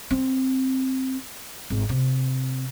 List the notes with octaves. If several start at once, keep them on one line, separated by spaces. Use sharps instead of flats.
C4
G#1
C3